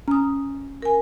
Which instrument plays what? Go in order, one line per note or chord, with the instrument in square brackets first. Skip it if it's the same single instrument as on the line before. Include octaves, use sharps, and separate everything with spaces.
[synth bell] C#4 [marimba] A#5 D#6
[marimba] A#4 G#5